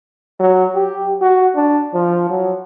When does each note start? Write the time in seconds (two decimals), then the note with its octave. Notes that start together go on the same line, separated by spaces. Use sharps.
0.40 F#3
0.75 G4
1.21 F#4
1.56 D4
1.94 F3
2.30 F#3